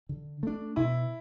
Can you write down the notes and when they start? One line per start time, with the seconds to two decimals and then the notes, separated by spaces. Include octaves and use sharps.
0.09 D3
0.43 A3 D4
0.76 B2 E4